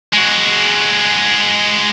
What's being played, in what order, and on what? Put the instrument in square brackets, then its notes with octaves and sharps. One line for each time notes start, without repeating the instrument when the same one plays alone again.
[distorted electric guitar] G#3 F#4